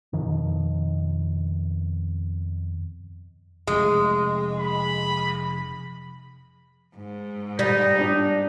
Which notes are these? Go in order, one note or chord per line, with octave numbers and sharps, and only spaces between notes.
F2 B2 D#3 F3
F1 G#3
B5
G#2
G3 D#4
D4